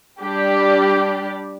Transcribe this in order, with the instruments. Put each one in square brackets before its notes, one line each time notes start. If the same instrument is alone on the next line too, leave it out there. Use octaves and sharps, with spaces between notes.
[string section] G3 D4 G4 D5